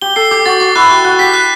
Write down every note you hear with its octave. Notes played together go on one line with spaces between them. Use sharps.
G4 G7
A4 C7
G4 D6
F#4 A6
F#4 D6
E4 F#6
G4 F#6
F#4 F#6
G4 B6
F#6